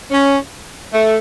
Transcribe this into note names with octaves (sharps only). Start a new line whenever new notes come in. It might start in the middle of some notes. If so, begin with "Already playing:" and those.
C#4
A3